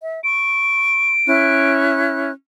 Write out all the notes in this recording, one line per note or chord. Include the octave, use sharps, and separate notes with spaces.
E5
C#6 D7
C#4 E4 F#6